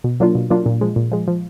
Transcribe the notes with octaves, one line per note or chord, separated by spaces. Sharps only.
B2
F#3 A#3 D4 F4
B2
F#3 A#3 D4 F4
A#2
F3 G#3
A#2
F3 G#3
F3